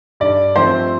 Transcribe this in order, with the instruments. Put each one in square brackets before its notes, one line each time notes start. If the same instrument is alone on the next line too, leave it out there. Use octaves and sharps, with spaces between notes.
[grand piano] G2 [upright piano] D5
[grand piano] F3 A3 C4 [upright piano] C5